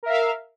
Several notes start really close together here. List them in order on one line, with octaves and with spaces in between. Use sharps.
A#4 E5 F5